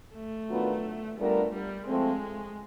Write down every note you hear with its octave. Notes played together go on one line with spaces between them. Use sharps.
A3
D#3 F#3 B3 D4 F4
G3 A3 B3 D4 F4 A#4
G3
F3 G#3 A3 C4